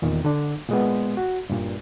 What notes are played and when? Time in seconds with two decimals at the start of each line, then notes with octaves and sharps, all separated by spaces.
0.02 E2 A#2 D#3
0.25 D3 D4
0.69 A#2 G#3 B3
1.17 F#4
1.50 G2 A#2